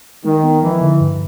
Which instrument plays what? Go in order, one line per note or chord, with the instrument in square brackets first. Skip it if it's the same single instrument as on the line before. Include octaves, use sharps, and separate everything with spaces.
[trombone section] D#3 [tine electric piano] G#3
[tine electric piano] B3
[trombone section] E3 [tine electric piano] F3
[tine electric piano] D3
G2